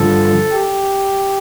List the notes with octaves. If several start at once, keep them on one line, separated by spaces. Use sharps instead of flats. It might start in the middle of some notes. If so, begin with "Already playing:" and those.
Already playing: G2 D3 F3 A4
G4